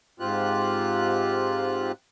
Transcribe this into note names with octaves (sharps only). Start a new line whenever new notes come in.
G#2 C4 F4 G4 F#6